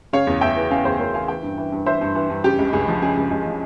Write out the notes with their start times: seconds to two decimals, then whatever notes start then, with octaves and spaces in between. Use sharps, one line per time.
0.13 C#3 C#5 F5
0.27 E2
0.41 E2 E5 G5
0.56 E3
0.70 C#3 F5 G#5
0.85 E2 G#4 C5
0.99 E2 A#4 C#5
1.14 E3 F5 G#5
1.28 E3 E5 G5
1.43 G2
1.58 E3
1.72 G2
1.86 E3 C5 E5
2.01 G2
2.15 E3
2.30 G2
2.44 C#3 G4
2.59 C#2
2.73 C#2 G#4
2.88 F3
3.02 C#3 G#4
3.17 C#2
3.31 C#2 G#4
3.46 F3